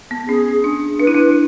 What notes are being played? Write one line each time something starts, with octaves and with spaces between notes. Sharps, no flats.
B3
C#4 G#4
D4
D4 B4
E4
D4